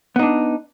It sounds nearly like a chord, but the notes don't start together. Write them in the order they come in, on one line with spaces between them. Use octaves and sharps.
B3 D#4 D4